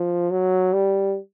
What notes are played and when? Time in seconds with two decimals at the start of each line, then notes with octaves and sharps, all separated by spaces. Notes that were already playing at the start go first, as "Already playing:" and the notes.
Already playing: F3
0.31 F#3
0.73 G3